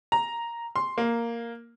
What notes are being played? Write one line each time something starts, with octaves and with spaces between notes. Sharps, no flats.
A#5
C6
A#3